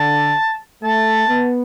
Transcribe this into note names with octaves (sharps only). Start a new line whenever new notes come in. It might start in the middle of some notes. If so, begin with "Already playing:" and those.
Already playing: D3 A5
A3 A5
B3